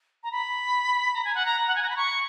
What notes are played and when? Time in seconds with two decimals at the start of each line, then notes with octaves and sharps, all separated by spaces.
0.23 A#5
0.32 B5
1.14 A#5
1.25 G#5
1.35 F#5
1.45 A#5
1.68 F#5
1.75 G#5
1.83 A#5
1.90 B5
1.96 C#6